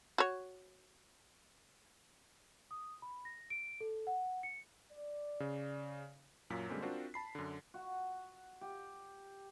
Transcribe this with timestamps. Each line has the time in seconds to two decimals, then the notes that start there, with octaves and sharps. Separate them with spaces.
0.18 F#4 C#5
2.71 D#6
3.02 B5
3.25 A#6
3.50 D7
3.81 A4
4.07 F#5
4.43 C#7
4.92 D5
5.40 C#3
6.50 F#2 A#2 F#3 F4 B6
6.69 D3 G3 G#3 A#3 C4 C#4
6.82 C4 D4 F4 F#4 A#4 C5
7.14 A5 B5 C7
7.35 F#2 D3
7.74 F#4
8.61 G4